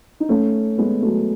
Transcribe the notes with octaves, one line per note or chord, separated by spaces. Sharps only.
D#4
A3 C#4
G#3 B3
F#3 A3